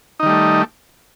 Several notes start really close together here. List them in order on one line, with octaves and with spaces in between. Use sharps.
D#4 D#3 G3 A3